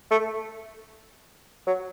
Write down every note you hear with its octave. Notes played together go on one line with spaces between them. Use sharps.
A3
F#3